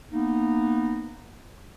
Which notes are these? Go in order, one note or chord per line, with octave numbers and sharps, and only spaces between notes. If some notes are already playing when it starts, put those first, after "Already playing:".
A#3 B3 D#4